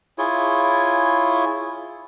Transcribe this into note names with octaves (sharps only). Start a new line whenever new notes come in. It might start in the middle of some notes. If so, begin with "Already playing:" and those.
E4 F4 G#4 C#5